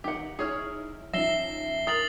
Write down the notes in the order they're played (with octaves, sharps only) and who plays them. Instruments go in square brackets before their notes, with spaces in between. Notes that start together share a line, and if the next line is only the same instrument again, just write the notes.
[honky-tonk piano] D#3 D#4 [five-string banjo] G4 F#5
[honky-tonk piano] D#4 E4 F6 [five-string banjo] G#4 C#5
[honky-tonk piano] F3 C#4 D#4 [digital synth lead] E5 [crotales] A#6 C7 G7
[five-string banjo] A#4 [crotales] D#6 A6 F#7